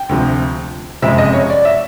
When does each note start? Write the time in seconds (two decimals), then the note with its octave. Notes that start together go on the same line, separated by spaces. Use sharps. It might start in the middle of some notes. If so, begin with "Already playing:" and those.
Already playing: G5
0.09 D2 C3 F3
1.02 F#1 F2 C3 F3 G#3 E5
1.18 D#5
1.33 C#5
1.50 D5
1.65 E5